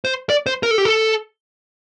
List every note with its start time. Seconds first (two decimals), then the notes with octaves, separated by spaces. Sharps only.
0.05 C5
0.30 D5
0.46 C5
0.63 A#4
0.71 A4
0.78 G4
0.85 A4